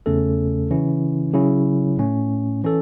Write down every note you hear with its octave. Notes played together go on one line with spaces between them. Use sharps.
E2 C#3 A3 C#4 A4
C#3 E3 C#4 E4
C#3 F#3 C#4 E4
A2 A3 C#4
E3 C#4 A4